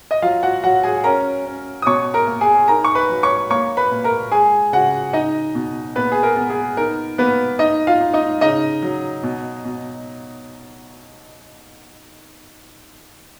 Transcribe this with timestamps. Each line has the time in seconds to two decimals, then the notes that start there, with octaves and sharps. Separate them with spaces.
0.11 D#5
0.22 F#3 F4 F5
0.43 F#4 F#5
0.63 F#3 F#4 F#5
0.83 G#4 G#5
1.04 C#4 A#4 A#5
1.46 C#4
1.82 D#6
1.86 B2 C#5 C#6
2.14 A#4 A#5
2.27 A#3
2.41 G#4 G#5
2.68 D#4 A#4 A#5
2.84 C#6
2.95 B4 B5
3.09 F#3
3.23 C#5 C#6
3.50 A#3 C#5 C#6
3.77 B4 B5
3.91 A#2
4.04 A#4 A#5
4.31 G#3 G#4 G#5
4.72 C#3 F#4 F#5
5.13 D#4 D#5
5.55 B2
5.96 A#2 B3 B4
6.12 G#4
6.23 A#4
6.36 B3
6.50 G#4
6.77 D#4 A#4
7.18 A#3 B3 B4
7.59 D#4 D#5
7.87 F4 F5
8.01 D#4
8.14 D#4 D#5
8.41 C#3 D#4 D#5
8.82 F#3
9.23 B2
9.65 B2